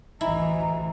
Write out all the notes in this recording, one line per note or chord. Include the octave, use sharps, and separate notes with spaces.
A1 D2 E3 E4 D#5 E5 G#5 A#5